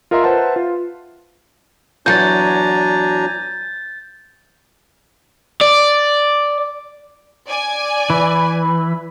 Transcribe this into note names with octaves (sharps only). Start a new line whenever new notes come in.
F4 A#4 D#5 E5 A#5 C6
B4 C5 E5 F#5 A5
F4
E2 F#3 D4 G#5 A#5 G6 A6
D5
D5 G#5
E3 B5